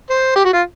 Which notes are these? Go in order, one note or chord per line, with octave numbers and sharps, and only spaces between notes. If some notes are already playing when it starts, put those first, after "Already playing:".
C5
G4
F#4
F4